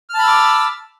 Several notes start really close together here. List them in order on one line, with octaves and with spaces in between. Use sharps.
F6 A5 B5 E6 D6